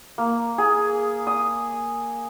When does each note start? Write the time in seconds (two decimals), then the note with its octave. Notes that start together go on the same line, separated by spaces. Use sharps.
0.18 A#3
0.58 G#4
1.27 D#6